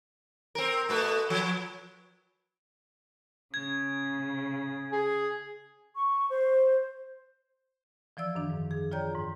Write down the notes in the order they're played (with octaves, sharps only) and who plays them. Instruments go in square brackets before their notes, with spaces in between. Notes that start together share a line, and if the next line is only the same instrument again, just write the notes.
[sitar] C4 A#4
B2 A3 B4
F3
[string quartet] C#3 [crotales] G#6
[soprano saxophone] G#4
[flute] C#6
C5
[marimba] E3 F3 D5 E6
F#2 D#3 D4
G#2
G#4
F4 C#5 D5 G5 A#5 G6
G#2